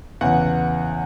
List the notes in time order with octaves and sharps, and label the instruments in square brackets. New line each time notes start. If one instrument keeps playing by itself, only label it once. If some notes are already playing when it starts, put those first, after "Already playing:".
[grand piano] E2 C#3 E3 F#5